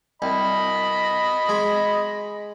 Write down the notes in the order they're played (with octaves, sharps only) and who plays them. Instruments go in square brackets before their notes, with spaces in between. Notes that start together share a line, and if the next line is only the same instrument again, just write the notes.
[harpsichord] C2 [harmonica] D#5 B5
[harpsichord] G#3